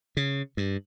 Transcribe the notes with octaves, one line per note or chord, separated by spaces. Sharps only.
C#3
G2